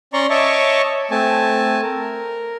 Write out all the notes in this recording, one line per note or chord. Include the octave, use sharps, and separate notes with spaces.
C#4 D5 A#5 C6 C#6
C#5 D#5 E5 A5 C#6 D6
A3 C4 G#5 A5
A#4